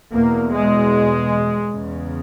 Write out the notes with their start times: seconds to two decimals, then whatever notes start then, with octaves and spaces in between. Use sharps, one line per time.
0.14 E2 B2 A#3
0.53 G#3
1.71 E2 C#3